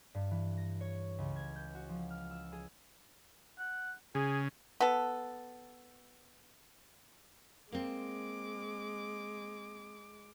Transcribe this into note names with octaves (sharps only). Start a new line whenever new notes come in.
G2
E3
A#6
C#5
C#2
G#6
G6
F#4
F3
F6
E6
G#4
F#5
C#3 G#4
B3 A4
G#3 A#3 C4 D6